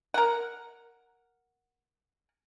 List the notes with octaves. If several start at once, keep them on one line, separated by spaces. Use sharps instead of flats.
A#4 F#5